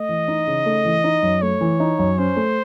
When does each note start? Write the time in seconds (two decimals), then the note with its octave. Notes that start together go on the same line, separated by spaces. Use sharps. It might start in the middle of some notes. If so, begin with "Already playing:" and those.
Already playing: A3 D#5
0.09 E3
0.28 D#4
0.47 C#3
0.66 A3
0.85 E3
1.04 D#4
1.23 F#2
1.42 A3 C#5
1.61 E3
1.80 D#4
1.99 F#2
2.18 C#4 C5
2.37 A3